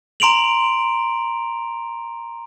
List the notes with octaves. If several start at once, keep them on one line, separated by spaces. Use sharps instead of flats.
A#5 C6 D7 F7 F#7